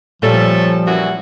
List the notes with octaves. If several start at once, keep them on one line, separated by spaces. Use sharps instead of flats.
A#2 F3 G3 A3 C#4 A4
F#2 E3 F#4